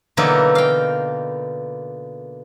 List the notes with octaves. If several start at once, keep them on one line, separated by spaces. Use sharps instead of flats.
B2 D3 E3 F#3 A#3 D#4
F5 G5